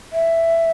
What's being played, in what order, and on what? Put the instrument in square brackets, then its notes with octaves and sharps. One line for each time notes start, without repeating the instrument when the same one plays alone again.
[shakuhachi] E5